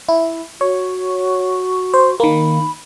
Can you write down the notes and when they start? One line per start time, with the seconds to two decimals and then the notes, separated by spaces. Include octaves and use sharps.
0.09 E4
0.61 F#4 C#5
1.94 C5
2.20 D#3 A#3 B5